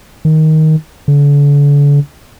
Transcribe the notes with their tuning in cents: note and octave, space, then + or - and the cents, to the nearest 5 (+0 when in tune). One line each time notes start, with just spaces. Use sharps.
D#3 +10
D3 -40